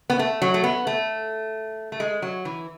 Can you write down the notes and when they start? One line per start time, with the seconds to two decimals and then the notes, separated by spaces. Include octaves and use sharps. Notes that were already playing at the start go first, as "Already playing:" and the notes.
0.10 B3
0.19 A3
0.42 F#3
0.54 A3
0.64 B3
0.87 A3
1.92 A3
2.00 G#3
2.22 F#3
2.45 E3